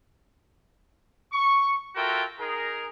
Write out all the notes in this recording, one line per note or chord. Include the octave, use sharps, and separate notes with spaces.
C#6
F4 F#4 A4 A#4 E5 G5
D#4 G#4 A#4